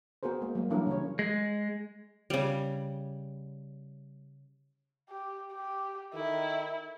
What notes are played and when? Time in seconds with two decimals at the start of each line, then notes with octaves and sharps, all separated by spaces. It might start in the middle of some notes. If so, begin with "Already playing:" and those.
0.23 B3 F#4 G#4 A#4 C5
0.42 G#3 A#3
0.55 F#3 G3 A#3
0.70 E3 F#3 G3 D4 E4 A#4
0.87 C#3 A#4 C#5
1.19 G#3
2.30 C#3 G3
5.09 G4
5.53 G4
6.14 D#3 E4 A4